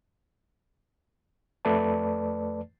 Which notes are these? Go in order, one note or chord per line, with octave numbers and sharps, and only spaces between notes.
F2 A3 B4 D5 A5